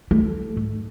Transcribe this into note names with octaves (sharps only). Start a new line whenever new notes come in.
A3
G#2